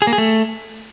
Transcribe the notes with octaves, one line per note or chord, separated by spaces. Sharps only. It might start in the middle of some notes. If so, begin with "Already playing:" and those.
G#4
A#3
G#4
A3